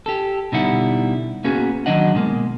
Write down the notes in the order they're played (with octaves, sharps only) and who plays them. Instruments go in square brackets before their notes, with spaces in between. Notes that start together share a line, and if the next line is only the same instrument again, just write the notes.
[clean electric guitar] G4 A4
B2 D3 G3 D#4 E4 F#5
A#3 B3 C#4 F#4 G#4
D#3 F#3 D4 D#5 F#5
B2 G#3 A#3